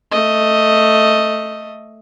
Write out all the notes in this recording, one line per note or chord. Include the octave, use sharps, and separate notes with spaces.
A3 D#5